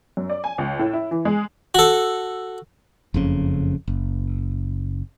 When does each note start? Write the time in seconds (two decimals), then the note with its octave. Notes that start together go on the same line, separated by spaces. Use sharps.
0.17 F#2
0.30 D5
0.44 G#5
0.58 C#2
0.79 A2
0.93 E4
1.11 E3
1.25 G#3
1.75 F#4 A4
3.14 F#1 F2 C#3
3.88 F#1